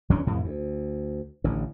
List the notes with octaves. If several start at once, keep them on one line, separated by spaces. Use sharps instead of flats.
E2 E3 C#4 D4
F2 A2 C3 E3
D2
A1 D3